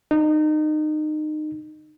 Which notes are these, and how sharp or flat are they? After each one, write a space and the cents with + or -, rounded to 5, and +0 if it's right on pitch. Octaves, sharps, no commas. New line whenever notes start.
D#4 -25